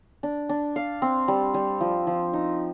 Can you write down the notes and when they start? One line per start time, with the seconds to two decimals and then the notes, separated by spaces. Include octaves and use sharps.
0.23 D4
0.49 D4
0.76 F5
1.02 C4
1.28 G3
1.54 G3
1.80 F3
2.07 F3
2.33 D#4